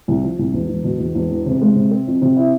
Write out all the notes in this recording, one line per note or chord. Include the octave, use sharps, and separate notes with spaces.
C2
F3
C2
E1
E1
B2
E1
E1
E2
C3
G#3
C3
C4
F2
C3
E4